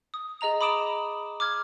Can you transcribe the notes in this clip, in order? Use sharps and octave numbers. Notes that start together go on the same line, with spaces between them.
D#6
G#4 D#5 A#5 F7
B5 D6 D#6 D7 E7 F#7
D6 F6 G#6